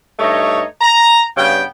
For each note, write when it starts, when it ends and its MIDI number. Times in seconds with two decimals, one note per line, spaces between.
0.19 0.62 43
0.19 0.62 57
0.19 0.62 63
0.19 0.62 73
0.19 0.62 75
0.81 1.23 82
1.37 1.63 43
1.37 1.63 49
1.37 1.63 59
1.37 1.63 79